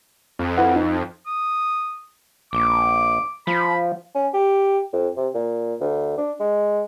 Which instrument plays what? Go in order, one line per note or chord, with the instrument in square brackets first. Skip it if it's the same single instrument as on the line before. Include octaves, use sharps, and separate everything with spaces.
[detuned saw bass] F2
[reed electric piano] E4 B4 F#5
D#4
[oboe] D#6
[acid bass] A#1 [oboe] D6
[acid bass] F3 [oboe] B5
[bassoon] C#4
G4
F2
C3
A#2
D2
D4
G#3